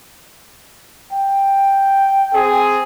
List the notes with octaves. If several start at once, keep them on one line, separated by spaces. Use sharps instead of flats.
G5
C4 G#4